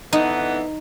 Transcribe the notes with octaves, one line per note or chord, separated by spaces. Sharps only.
D3 E3 B3 D#4